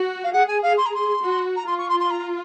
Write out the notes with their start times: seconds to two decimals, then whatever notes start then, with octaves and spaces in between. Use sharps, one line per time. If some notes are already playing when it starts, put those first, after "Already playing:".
Already playing: F#4
0.23 F5
0.32 G#4 F#5
0.47 G#5
0.62 F5
0.77 C6
0.85 A#5
0.94 C6
1.22 F#4
1.56 A#5
1.66 F4 C6
1.78 C#6
1.89 C6
1.99 C6
2.10 A#5